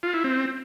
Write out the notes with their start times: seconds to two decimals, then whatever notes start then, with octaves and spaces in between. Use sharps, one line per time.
0.03 F4
0.14 E4
0.24 C4